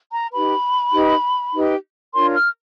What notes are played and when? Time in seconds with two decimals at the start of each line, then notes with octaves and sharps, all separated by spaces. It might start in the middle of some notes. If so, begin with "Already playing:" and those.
0.11 A#5
0.32 D#4 G4 B4 B5
0.93 D#4 G4 B4
1.53 D#4 G4 B4
2.13 D4 F4 A#4 C#5 C6
2.34 F6